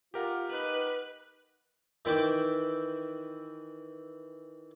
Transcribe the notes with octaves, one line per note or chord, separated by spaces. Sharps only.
F4 G4 A#4 F#5
D#4 B4
D#3 E3 E5 G5 B5 D6